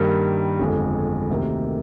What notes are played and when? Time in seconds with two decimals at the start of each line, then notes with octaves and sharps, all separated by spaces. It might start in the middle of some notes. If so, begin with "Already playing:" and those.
Already playing: G2 D#3 G3 A#3
0.59 G1 F2 D3 G#3
1.29 D2 C3 D#3 A#3